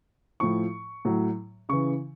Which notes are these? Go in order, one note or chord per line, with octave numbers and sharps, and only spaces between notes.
A2 F3 C#6
A2 F#3
C#3 E3 C#6